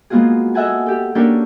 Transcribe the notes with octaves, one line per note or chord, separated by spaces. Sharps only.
G#3 A#3 B3 F4 F#4 G#4
A4 D#5 E5 F#5 G#5 A5
G4 A4
A#3 C#4 D4 G4 A4 A#4